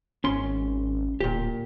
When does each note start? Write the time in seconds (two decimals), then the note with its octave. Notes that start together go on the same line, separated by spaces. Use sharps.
0.24 G#1 C#4 C6
1.20 D1 A#2 G4